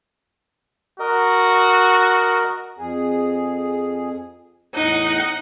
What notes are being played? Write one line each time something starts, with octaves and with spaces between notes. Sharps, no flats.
F#4 A#4 D#5
F2 G#4
E2 A2 D#4 F#5